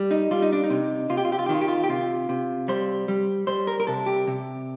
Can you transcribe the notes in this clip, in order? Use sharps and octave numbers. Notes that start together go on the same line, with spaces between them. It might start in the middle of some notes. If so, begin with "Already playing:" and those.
Already playing: G3
D#4
G3 F4
D#4
D4
D#4
C3
C3 F4
G4
F4
G4
F4
G4
D#3
F4
G4
F4
G4
C3 F4
C3
G3 C5
G3
G3 C5
A#4
A#4
C3 A4
G4
C3